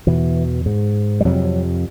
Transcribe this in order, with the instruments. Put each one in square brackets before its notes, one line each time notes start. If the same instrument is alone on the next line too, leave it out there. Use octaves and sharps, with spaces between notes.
[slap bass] E2 B2 E3
G#2
G3
F2 C3 F#3